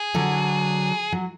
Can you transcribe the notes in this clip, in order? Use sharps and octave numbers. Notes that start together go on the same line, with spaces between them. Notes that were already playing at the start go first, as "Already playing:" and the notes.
Already playing: G#4
D3 F#3
F#3